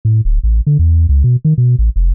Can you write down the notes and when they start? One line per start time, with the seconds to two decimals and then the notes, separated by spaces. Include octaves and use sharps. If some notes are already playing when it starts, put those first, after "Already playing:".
0.05 A2
0.25 D1
0.43 A1
0.67 D3
0.79 E2
1.09 C#2
1.24 B2
1.45 D#3
1.58 B2
1.79 A1
1.96 F1